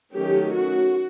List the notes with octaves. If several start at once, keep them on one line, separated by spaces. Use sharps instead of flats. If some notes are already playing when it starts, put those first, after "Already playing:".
D#3 F#3 A3 C#4 G4
F#4